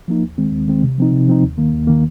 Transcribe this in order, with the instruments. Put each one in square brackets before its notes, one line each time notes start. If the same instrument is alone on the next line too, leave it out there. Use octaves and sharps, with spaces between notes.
[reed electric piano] F3 A#3 D#4
D#2
D#3 G#3 C4
D#2
D#3 G#3 C4
C3
F3 C4 D#4
C3
F3 C4 D#4
D#2
D#3 A#3
D#2
D#3 A#3